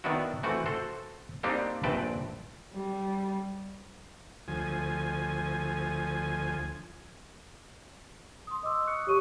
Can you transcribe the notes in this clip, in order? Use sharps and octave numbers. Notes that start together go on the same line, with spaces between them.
D#3 B3 D4 E4 F#4
E3 A3 C4 F#4
F#4 A4 C5
G3 A#3 C4 D4 D#4 G4
A#1 G2 C4 B4 G5 A5
G3
D2 F3 G#5
C6 D#6
D#5 D6 E6
C#6 D#6 F#6 C#7
G4 C#5 C#6 D#7